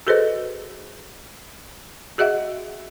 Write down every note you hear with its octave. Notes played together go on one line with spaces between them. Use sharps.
F#4 G#4 A4 B4 C5 D#5
F#4 G#4 D#5 E5 F#5